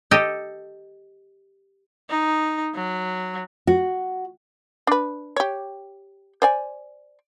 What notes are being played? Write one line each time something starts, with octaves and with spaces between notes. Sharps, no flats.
G4 A4 D#5
D#4
F#3
F#4
D4 B4
G4 C#5
C5 D5 G#5